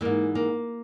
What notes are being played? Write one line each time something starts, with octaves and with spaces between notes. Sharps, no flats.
G#2 E3 A#3
A#3